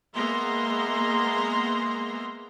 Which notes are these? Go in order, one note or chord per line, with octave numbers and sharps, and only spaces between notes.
G#3 A#3 B3 E5 A#5 C6